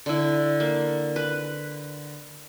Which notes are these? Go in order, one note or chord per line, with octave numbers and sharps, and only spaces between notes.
D3 E4
A#3
B4